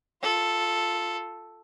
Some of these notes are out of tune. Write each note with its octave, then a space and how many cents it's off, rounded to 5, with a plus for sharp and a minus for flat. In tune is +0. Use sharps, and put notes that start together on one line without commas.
F4 +0 A4 +0